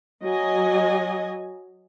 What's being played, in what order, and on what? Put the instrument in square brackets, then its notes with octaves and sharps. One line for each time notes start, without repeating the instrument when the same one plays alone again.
[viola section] F#3 D#5 G#5